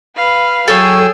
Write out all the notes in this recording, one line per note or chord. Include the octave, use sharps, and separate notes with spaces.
B4 F5
F#3 G#4 A4 C#5 G5 E6